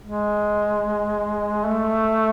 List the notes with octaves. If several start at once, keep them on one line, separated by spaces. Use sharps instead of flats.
G#3
A3